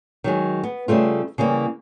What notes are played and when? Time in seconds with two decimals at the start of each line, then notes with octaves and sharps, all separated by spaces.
0.24 D#3 F#3 G#3
0.63 B3
0.88 C#3 G3 A3 F4
1.38 C#3 E3 G3 A#3